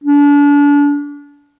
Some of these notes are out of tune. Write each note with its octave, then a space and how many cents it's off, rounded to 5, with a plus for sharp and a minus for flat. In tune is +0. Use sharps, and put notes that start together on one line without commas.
D4 -35